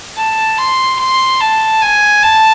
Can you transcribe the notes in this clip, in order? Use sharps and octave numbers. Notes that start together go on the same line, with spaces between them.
A5
C6
C6
A5
G#5
A5